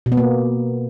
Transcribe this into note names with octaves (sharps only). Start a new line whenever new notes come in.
B2
B3
A#3